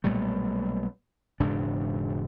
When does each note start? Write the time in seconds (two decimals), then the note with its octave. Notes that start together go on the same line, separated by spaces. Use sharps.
0.04 B1 A#2 G3 A3
1.40 E1 G#2 C#3 D4